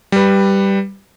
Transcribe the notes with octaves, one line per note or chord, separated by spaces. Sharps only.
G3 B4